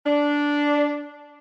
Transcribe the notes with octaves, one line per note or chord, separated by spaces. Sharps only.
D4